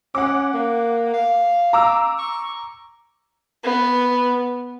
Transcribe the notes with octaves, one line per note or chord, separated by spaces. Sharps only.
C#4 F#5 D6
A#3
F5
A#5 D6 E6
C#6
B3